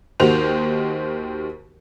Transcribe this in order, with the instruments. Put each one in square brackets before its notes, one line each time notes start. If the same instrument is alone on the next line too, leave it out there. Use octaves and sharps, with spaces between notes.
[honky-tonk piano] D#2 D#3 F#4 G4 C5 F7